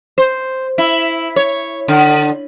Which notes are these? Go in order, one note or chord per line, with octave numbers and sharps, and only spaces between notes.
C5
E4
C#5
D3